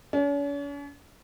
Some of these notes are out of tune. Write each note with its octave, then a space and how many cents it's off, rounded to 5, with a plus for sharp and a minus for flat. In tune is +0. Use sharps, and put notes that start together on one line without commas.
C#4 +45